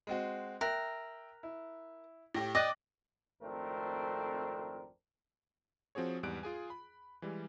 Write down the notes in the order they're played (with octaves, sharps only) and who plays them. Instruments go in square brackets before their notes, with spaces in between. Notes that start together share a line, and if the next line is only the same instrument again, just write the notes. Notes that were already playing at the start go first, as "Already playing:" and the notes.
[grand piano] G#3 C4 F#4
[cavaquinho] A#4 [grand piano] E5 G5 F#6
[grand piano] E4
[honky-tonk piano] A2 G4 [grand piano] A#6
[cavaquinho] D5 D#5 D#6 [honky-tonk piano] G5 D6 F#6
[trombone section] G#1 F2 A3 C4 D4 A#4
[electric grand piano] F3 C4 F#4 G#4 C#5
E2 G#2 G3 F#6 D7
F4 G#4 G#5
B5
E3 G3 G#3